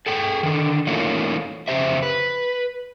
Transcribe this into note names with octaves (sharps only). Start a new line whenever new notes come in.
G#4 A4 G5
D3 D#3
E3 A3 A#3 C#4 D#4 F4
F2 C#3 G4 C5 E5
B4